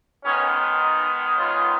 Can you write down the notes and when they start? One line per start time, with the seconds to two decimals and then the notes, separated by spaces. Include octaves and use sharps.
0.24 D#3 G#3 B3 C#4
0.81 D#4
1.37 C#4 F4